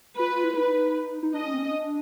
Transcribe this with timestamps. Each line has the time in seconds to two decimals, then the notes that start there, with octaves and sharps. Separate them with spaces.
0.18 F4 B4
0.32 F4
0.44 E4
0.57 D#4 B4
1.23 D#4
1.34 D4 D#5
1.46 C#4
1.54 C4
1.58 C#4
1.71 D4